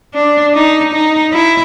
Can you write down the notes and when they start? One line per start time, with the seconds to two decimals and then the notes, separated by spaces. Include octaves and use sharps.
0.14 D4
0.54 D#4
0.93 D#4
1.33 E4